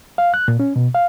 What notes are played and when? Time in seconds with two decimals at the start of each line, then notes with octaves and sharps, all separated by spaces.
0.18 F5
0.34 F#6
0.48 A#2
0.60 C#4
0.76 B2
0.95 F5